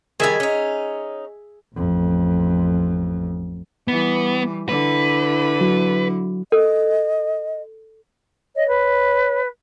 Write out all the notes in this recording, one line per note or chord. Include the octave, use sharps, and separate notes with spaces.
D#3 G3 G#4 E5 G#5
C#4 D#4
A1 F2
E3 G3 B3
D3 E4 B4
F#3 F#4
A4 D#5
C#5 D#5
B4